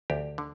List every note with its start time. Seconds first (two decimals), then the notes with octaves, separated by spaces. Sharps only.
0.10 D2 G4
0.38 D3